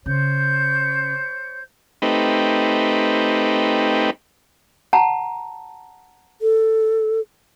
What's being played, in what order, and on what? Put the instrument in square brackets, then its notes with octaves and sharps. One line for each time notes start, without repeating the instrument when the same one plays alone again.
[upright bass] C#3 [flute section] C5 C#5 G6
[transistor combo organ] A3 C4 D#4 G4 B4
[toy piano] F#5 A5 A#5
[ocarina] A4